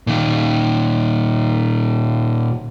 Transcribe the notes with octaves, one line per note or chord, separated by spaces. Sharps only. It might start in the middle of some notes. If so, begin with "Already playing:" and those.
A#2 D#3